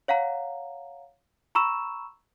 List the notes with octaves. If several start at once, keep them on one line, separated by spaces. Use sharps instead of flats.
C#5 F5 F#5 A#5
A#5 B5 C#6 E6 E7